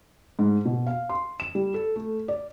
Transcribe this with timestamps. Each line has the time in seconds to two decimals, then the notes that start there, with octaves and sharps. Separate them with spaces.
0.39 G#2
0.65 B2
0.87 F5
1.09 C6
1.40 E7
1.55 G3
1.74 A4
1.96 A3
2.28 D5